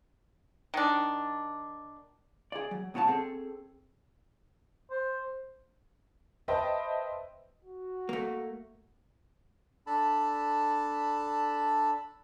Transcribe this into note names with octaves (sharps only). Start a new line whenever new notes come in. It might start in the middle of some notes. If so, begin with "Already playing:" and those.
D#3 D4
G#4 D5
F#3
C#2 B2 F#4 C#5 A5
C4 G#4 A4
C5
B4 C5 D#5 E5 G5 A5
F#4
A3 A#3
D4 A4 A5 B5